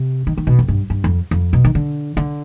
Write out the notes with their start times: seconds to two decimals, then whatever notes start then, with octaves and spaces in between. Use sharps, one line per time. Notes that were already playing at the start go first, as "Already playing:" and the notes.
Already playing: C3
0.27 D#3
0.38 D#3
0.47 B2
0.59 F2
0.68 G2
0.90 G2
1.04 F2
1.31 F2
1.53 B2
1.65 D#3
1.75 D3
2.17 D3